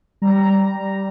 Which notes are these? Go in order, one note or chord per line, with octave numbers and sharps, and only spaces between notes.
G3 A#5
A#5